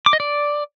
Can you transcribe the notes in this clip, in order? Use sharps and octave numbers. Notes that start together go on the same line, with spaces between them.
D6
D#5
D5